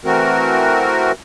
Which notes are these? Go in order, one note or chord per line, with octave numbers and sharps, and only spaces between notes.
E3 A3 C4 F#4 A#4